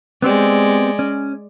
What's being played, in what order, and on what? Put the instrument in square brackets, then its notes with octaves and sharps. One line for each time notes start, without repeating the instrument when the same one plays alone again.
[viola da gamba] G#3 D5 [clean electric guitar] B3 C4 G4
[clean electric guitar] C#4